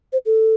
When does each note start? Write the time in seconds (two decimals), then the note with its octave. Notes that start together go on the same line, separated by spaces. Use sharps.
0.13 C5
0.26 A4